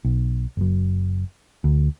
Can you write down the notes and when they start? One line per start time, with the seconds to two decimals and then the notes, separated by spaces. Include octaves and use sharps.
0.05 B1
0.57 F#1 F#2
1.64 D2